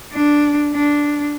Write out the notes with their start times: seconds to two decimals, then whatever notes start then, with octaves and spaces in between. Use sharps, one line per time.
0.12 D4
0.73 D4